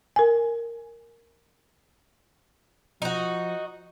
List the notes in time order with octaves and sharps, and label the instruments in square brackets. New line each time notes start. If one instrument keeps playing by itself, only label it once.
[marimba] A#4 G#5
[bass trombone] F3 [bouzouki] D#4 F#4